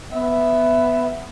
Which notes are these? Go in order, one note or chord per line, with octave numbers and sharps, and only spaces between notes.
B3 E5